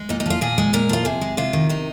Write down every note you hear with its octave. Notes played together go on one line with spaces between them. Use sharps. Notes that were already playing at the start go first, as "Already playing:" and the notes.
Already playing: G#3
A#2 D#4
D#4
F3 F4
A#2 G#4
G#3
A#2 A#4
F3 F4
C3 G#4
G#3
C3 F4
D#3
C3 D#4